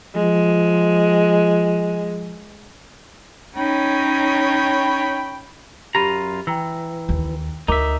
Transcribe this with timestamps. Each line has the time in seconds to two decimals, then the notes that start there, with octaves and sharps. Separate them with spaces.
0.16 F3 G#3
3.56 C#4 D#4 C#5 G5 B5
5.95 F#2 F4 G4 A#5 B5 D#7
6.47 E3 G5 A#5 E6
7.09 D#2
7.68 D2 D#4 A#4 E5 D6